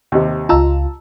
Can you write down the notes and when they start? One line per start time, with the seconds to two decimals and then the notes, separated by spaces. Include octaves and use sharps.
0.12 D#2 C3
0.49 C#2 F4 A5 A#5 E6